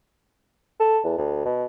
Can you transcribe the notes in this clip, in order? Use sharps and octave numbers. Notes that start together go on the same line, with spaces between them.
A4
E2
D2
B2